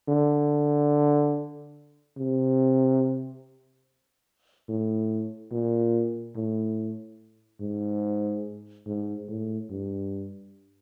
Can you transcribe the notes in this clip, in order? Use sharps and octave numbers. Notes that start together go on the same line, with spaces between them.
D3
C3
A2
A#2
A2
G#2
G#2
A2
G2